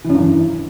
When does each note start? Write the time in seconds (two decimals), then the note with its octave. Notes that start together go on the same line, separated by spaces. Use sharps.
0.04 E3
0.10 F#2
0.15 G2
0.20 E3